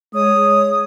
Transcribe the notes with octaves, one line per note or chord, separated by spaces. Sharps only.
G#3 C#5 D#6